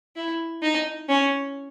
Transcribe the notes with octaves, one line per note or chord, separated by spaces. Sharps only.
E4
D#4
C#4